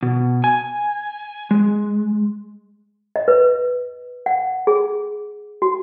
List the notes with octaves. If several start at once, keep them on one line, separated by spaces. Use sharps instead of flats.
B2
G#5
G#3
D#5
B4
F#5
G#4
F#4